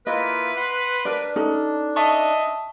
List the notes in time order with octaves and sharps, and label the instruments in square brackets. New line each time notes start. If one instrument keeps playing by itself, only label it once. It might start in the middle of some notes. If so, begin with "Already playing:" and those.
[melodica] A#3 E4 F4 [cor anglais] B4 [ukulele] D#5
[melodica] F#5 B5 C6
[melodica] D4 [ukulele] A#4 D5
[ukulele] C#4 D#4 A4
[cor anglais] D#5 [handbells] E5 A5 C#6